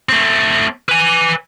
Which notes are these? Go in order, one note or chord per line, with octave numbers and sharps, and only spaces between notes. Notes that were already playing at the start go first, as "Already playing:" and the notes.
A3 C4
B4 G#5